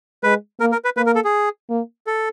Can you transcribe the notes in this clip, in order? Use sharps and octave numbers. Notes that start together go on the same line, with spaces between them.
G#3 B4
A#3 A#4
A#4
B4
A#3 B4
A#4
A4
G#4
A#3
A4